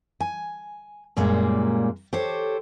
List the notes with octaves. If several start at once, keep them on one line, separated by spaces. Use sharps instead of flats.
G#5
F#2 A#2 G3 G#3 A#3
G4 A4 C5 C#5